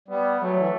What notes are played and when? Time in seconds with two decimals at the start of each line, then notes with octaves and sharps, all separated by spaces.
0.08 G3 B3
0.40 F#3 A3
0.56 E3